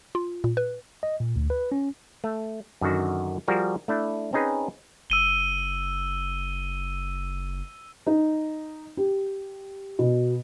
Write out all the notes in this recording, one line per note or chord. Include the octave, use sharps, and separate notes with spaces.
F4
A#2
B4
D#5
A#2
D2
B4
C#4
A3
F#2 D3 D#3 F#4
F3 G3 F#4 G#4 A#4
A3 D4 E4
C4 C#4 D#4 G#4 B4
F#1 E6 D#7 G7
D#4
G4
B2